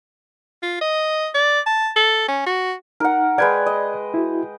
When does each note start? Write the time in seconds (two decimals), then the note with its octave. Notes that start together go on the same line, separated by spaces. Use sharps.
0.63 F4
0.81 D#5
1.34 D5
1.66 A5
1.96 A4
2.28 C#4
2.46 F#4
3.00 D#4 A#4 F#5
3.38 G#3 B4 D5 G5 G#6
3.66 D#5
4.14 E4 F#4